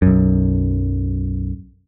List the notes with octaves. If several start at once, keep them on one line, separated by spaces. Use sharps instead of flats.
B1 F#2